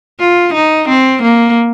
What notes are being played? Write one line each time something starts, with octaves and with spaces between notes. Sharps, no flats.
F4
D#4
C4
A#3